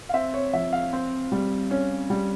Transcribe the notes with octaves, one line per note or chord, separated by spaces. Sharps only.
F5
C4 E5
C#5
F3 E5
F5
C4
G3
C#4
G3